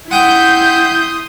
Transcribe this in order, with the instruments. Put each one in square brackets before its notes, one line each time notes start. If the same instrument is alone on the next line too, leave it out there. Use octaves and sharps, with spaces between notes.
[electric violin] E4 G6 [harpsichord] F#5 G5 [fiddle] C6 D#6